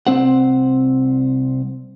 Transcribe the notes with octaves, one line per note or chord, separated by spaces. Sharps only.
C2 C4 C5 F#5